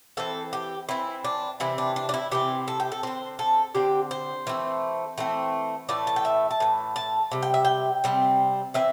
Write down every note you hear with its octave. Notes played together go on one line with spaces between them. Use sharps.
E3 C4 A4
G4
E3 C4 E4
D4
C3 E3 C4 E4
D4
D4
D4
E4
C3 E3 C4 G4
A4
G4
A4
D3 C4 C5
A4
D3 C4 G4
C5
E3 A3 C4
E3 A3 C4
A2 E3 A3 D5
A5
G5
E5
A5
A2 E3
A5
C3 G3
G5
E5
G5
C3 G3 C4
E3 C4 E5